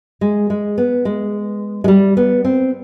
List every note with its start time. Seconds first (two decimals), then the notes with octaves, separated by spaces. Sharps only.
0.21 G#3
0.50 G#3
0.78 B3
1.05 G#3
1.84 G#3
1.88 G3
2.17 B3
2.45 C4